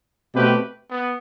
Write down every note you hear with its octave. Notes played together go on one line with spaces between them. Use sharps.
B2 A3 C4 G4 B4
B3